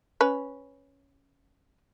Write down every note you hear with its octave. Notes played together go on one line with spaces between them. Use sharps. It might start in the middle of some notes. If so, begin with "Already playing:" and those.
C#4 B4